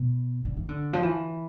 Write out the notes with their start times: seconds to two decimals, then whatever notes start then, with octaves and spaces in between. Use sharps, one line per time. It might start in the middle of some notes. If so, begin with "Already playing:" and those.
Already playing: B2
0.45 D3
0.57 E3
0.69 D3
0.93 F3
1.03 E3